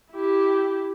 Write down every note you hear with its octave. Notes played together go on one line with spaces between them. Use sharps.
E4 G4